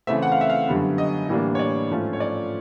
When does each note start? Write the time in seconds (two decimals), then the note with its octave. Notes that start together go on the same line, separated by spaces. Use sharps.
0.07 C#3 E3 A3 C4 E5
0.22 F#5
0.32 F5
0.41 E5
0.50 F5
0.68 F#2 D3 G3 B3
0.98 D#5
1.29 A2 E3 G3 A#3 D4
1.55 C#5
1.59 D5
1.91 G#2 F3 A3 C#4 F4
2.13 C#5
2.20 D5